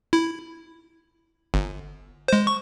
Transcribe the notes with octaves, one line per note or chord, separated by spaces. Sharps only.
E4
G1
G#3 C5
C#6